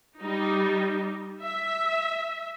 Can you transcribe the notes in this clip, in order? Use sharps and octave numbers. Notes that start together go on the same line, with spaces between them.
G3 D#4
E5